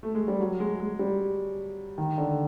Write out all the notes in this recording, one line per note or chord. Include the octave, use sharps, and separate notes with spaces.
A3
G#3
G3
F#3
G#3
G#3
G3
D#3
D3